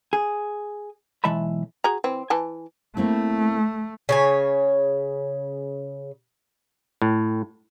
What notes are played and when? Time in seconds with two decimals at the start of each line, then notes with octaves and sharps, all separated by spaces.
0.13 G#4
1.24 B1 E3 G#3 E5 A5 B5
1.84 F#4 G#4 A#5
2.04 E3 C4
2.30 E3 G#5 A5
2.97 A3 A#3 C4 E4
4.09 C#3 C#5 G#5
7.02 A2